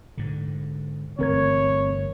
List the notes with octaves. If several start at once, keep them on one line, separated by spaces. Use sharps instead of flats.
G#2 D3
G1 E3 A3 C4 A#4 C#5 G#6